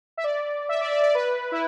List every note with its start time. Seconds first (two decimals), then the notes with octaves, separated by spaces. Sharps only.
0.17 E5
0.24 D5
0.69 E5
0.81 D5
0.87 E5
0.92 D5
1.03 D5
1.15 B4
1.52 E4